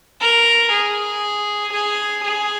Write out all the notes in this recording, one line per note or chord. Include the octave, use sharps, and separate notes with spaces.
A#4
G#4
G#4
G#4